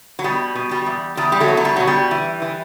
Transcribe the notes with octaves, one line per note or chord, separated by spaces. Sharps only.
F#3
B2 G3
B2
G3
E2
E2 G3
G3
F#3 A3
B2
F#3
G3
B2 F#3
G3
E3
E3